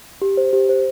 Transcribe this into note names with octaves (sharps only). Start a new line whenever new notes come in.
G4
C5
G4
C5